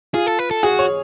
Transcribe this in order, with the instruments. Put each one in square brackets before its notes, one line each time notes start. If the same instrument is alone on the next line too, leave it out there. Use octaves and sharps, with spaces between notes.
[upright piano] F4 [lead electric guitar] G#4
[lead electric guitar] A4
B4
A4
[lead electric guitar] F#4 [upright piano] G#4
[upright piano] C#5